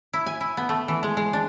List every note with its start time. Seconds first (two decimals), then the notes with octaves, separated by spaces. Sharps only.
0.13 E4
0.26 G#5
0.41 E4
0.57 B3
0.69 A3
0.88 E3
1.03 G#3
1.17 G#3
1.33 D4